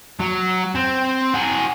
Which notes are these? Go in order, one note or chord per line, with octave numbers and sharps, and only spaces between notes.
F#3
C4
F#4 G#4